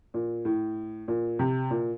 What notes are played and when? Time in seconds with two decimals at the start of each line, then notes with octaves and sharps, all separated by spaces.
0.14 A#2
0.45 A2
1.08 A#2
1.39 C3
1.71 A#2